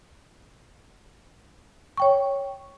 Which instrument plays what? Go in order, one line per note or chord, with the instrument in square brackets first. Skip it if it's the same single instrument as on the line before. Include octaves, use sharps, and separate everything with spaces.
[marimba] C#5 G5 C#6